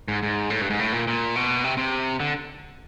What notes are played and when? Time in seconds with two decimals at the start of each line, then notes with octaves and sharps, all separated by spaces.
0.08 G#2
0.23 G#2
0.50 A2
0.62 G2
0.70 G#2
0.79 A2
0.93 A#2
1.08 A#2
1.36 B2
1.64 C3
1.77 C3
2.20 D3